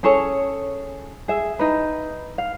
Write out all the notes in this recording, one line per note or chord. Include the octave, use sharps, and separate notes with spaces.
C#4 G#4 A4 C#5
G#4 E5
D#4 B4
F5